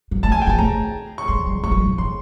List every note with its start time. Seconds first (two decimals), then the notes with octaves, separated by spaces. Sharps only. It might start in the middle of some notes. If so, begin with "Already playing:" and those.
0.11 F#3
0.23 A3 A5
0.32 G#5
0.42 G5
0.47 A#3
0.49 A5
0.58 A3 A#5
1.18 C#6
1.28 G#3 C6
1.46 G3
1.63 G#3 C#6
1.71 G3
1.80 F#3
1.89 F3
1.98 E3 C6